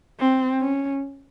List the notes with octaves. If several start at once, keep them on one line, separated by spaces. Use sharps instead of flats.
C4
C#4